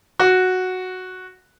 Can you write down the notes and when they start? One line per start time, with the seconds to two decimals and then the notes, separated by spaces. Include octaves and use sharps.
0.20 F#4